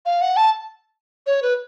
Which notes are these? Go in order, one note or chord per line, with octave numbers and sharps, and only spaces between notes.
F5
F#5
A5
C#5
B4